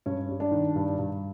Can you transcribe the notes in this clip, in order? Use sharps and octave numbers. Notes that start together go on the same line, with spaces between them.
G2 C#4
G3
D4
D#3
G2
G2